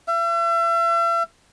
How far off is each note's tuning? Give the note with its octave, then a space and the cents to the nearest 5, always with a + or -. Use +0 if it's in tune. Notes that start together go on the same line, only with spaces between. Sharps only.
E5 +40